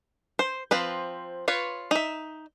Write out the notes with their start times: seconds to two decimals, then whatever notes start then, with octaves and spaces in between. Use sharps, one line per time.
0.39 C5
0.71 F3 C4 B4
1.48 F4 B4 C#5
1.91 D#4 E5